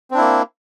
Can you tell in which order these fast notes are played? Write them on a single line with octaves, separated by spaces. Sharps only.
C4 D4 E4 A#3